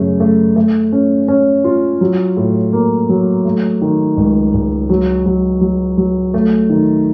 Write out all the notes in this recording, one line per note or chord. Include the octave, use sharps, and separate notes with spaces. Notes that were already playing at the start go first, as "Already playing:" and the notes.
Already playing: F#2 C#3 A3
A3
A3
C#4
C#4
F4
F#3
A2
A#3
F#3
A3
D#3
C#2
C#2
F#3
F#3
F#3
F#3
A3
D#3